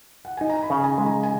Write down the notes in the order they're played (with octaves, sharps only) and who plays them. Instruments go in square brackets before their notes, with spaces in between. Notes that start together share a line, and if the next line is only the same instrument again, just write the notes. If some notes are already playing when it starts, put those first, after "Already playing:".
[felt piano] F#5
[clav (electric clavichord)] D#4 [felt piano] G#5
[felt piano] A#5
B5
[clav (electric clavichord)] C#3
[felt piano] G#5
[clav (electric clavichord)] G#3
[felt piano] A#5
G#5